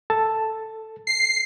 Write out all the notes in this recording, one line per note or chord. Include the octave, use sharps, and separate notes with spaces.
A4 A5
C7